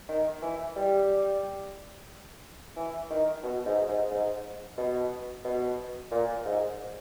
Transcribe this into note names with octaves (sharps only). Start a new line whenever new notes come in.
D#3
E3
G3
E3
D#3
B2
G#2
G#2
G#2
B2
B2
A#2
G#2